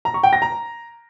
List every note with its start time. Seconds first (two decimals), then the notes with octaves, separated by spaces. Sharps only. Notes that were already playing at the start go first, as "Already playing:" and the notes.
0.05 A#5
0.14 C#6
0.23 G5
0.33 A#6
0.42 A#5